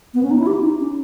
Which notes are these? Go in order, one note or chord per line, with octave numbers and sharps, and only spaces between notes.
B3
C#4
D#4
E4
G4
D#4
C#4